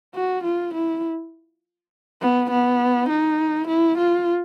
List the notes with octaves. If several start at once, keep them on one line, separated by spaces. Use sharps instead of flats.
F#4
F4
E4
B3
B3
D#4
E4
F4